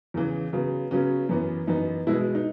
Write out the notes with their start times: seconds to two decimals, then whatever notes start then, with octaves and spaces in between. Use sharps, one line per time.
0.14 E2 C#3 E3
0.53 C#3 F#3 B3
0.91 C#3 F#3 B3 C#4
1.29 F#2 E3 B3
1.67 F#2 E3 B3 D#4
2.07 B2 G#3 B3 E4
2.35 D#4